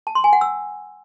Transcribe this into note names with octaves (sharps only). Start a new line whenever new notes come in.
A5
C6
G#5
F#5
E6